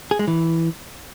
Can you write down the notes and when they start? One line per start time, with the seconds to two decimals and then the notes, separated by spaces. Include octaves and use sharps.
0.11 G#4
0.19 G#3
0.27 E3